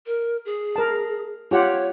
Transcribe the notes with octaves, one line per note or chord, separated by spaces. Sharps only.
A#4
G#4
A#4 A5
F4 G4 C#5 F#5